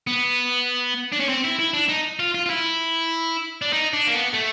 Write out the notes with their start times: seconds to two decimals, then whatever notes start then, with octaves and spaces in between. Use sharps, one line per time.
0.07 B3
1.12 D4
1.20 C#4
1.29 C4
1.44 E4
1.59 E4
1.74 D4
1.89 D#4
2.20 F4
2.35 F4
2.46 F4
2.50 E4
3.62 D4
3.73 D#4
3.93 D4
4.07 A#3
4.13 B3
4.33 A3